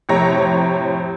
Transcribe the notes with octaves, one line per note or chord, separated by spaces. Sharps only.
F2 A2 C3 C#5 A#5 A#6